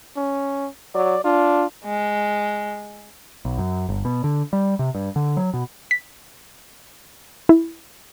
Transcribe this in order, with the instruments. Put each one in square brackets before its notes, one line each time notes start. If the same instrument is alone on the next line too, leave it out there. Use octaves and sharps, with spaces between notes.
[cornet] C#4
[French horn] F#3 [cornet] D5
[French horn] D4 [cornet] F4
[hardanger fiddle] G#3
[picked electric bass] B1
F#2
G1
B2
D3
G3
C3
G2
D3
F#3
B2
[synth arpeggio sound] B6
E4